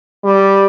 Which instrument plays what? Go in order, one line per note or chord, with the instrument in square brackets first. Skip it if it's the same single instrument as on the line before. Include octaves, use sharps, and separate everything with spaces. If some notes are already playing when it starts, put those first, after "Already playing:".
[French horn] G3